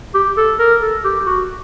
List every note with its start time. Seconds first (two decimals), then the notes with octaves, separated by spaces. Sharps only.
0.14 G4
0.37 A4
0.59 A#4
0.81 A4
1.04 G4
1.27 F#4